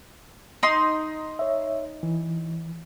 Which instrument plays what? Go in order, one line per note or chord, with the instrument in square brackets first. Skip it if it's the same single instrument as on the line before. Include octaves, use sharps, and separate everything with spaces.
[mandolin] D#4 C6
[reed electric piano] C#5 E5
E3